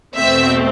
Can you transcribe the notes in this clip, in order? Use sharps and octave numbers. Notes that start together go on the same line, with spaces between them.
E2 B2 A3 C4 E5